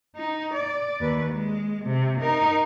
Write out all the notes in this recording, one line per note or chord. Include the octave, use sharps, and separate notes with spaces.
D#4
D5
D#2 B4
G#3
C3
D#4 A#4